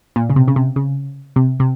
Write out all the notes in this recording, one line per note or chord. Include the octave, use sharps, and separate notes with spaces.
A#2
C#3
C3
C#3
C3
C#3
C3
C3